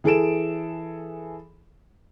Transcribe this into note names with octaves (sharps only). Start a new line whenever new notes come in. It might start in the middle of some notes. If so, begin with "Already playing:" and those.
E3 G#4 A4 D7 E7